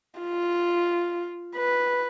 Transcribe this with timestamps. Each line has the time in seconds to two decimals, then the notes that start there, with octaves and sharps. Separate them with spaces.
0.20 F4
1.56 B4